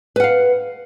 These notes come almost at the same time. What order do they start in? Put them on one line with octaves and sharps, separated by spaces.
B4 F#5 F5